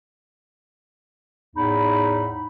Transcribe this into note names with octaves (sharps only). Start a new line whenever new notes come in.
E2 A2 D#4 B5